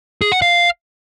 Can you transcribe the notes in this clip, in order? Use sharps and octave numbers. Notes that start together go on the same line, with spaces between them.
G#4
F#5
F5